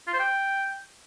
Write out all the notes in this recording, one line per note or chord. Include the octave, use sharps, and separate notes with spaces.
F4
C5
G5